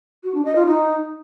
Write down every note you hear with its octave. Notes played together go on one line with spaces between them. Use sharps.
F#4
D4
D#5
F4
D#4